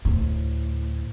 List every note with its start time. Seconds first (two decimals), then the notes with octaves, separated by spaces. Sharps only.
0.05 D2 A2